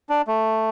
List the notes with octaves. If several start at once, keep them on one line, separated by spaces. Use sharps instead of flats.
D4
A3